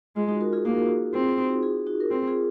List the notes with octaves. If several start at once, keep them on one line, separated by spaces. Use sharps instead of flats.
G#3 F4
D#4 F#4
F#4 A#4
F4 G#4
A#3 D#4 F#4
C4 F4 G#4
F4
D#4 F#4
F4 G#4
D#4 F#4
A#4
C4 F4 G#4
F4 G#4